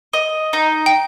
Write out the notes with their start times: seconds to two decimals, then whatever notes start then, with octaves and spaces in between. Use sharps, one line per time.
0.13 D#5
0.53 D#4
0.86 G5